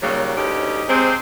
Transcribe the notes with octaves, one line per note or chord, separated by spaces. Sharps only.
D#2 C#3 F#3 G3 A#3
D2 G2 C#4 D#4 G4
C3 G#3 C4